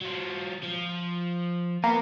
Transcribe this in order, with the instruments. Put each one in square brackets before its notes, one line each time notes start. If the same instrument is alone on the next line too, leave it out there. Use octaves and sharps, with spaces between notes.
[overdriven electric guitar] F#3 F4
F3
[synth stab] A#3 [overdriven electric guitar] B3 B4